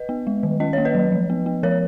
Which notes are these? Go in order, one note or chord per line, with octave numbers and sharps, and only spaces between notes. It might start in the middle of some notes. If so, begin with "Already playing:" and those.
Already playing: B4 D#5
B3
G#3
D#3
C#4 D#5
A#3 C#5
B4 D#5
F#3
F3
B3
B3
F3 A#4 C#5